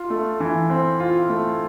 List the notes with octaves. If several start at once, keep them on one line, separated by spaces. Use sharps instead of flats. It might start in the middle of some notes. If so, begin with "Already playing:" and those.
Already playing: F4
A3
E3
C4
F4
A3